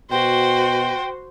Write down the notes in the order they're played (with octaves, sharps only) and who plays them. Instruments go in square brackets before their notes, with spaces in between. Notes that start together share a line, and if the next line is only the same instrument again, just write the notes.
[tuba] B2 [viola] F#4 C5 [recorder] G5